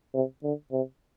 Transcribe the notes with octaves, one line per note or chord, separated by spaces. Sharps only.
C3
D3
C3